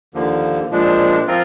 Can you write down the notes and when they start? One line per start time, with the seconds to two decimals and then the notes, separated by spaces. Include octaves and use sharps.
0.14 D#2 D3 F3 A#3
0.71 A#2 F3 G#3 D4
1.27 F3 C4 F4 A#4